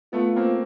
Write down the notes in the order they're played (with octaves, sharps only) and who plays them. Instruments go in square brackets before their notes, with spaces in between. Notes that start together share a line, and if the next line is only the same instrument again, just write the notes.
[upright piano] A3 B3 [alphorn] F4
[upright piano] A#3 C4